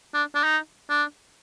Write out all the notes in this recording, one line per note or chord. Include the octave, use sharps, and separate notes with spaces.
D4
D4
D#4
D4